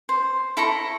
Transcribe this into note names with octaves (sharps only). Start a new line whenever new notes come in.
C5
E4 A4 A#5 C#6